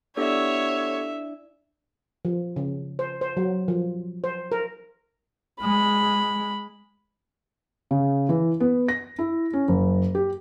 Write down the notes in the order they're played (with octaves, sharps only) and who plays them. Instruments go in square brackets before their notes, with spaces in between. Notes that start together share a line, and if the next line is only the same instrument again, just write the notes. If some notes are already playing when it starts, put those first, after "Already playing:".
[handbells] B3 G4 A4 [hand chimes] D4 E4 D5 [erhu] C#5 [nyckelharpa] E5
[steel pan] F3
C#3
C5
C5
F#3
F3
C5
A#4
[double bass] G#3 [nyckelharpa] B5
[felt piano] C#3
E3
B3
A#6
E4
C#4
F#1
G4